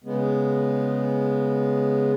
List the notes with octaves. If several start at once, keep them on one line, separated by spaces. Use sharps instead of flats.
C#3 G#3 B3